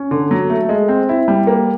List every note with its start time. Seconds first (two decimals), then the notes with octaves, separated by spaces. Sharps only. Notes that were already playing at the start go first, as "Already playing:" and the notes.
Already playing: C#4
0.11 D3
0.31 F#3
0.50 A3
0.69 G#3
0.88 C4
1.09 E4
1.28 G3
1.47 A#3